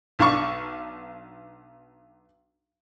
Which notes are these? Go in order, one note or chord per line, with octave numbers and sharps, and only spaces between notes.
B1 D4 F5 C#6